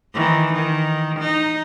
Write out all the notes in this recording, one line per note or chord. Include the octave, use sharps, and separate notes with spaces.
D#3 E3
D#3
D#4